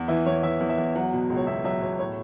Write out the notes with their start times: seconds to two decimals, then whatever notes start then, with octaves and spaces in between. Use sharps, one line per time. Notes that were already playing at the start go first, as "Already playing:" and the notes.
Already playing: E2
0.08 E3 E4
0.26 E2 C#5
0.43 E3 E5
0.60 E2
0.69 E5
0.78 E2
0.95 F#3 F#5
1.13 B2
1.30 C#2
1.37 C#5
1.47 B2 E5
1.64 F#3 E5
1.82 B2 C#5
1.99 A2 C#5